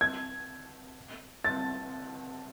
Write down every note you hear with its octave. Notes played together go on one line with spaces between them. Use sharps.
G#6
A6